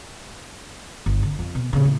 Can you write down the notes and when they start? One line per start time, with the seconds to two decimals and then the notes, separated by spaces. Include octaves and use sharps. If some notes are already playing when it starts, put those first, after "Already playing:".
1.06 G1
1.23 D3
1.39 F2
1.55 B2
1.73 A#2 C#3
1.85 A2